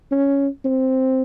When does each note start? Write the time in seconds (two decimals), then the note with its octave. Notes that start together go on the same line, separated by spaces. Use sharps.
0.11 C#4
0.65 C4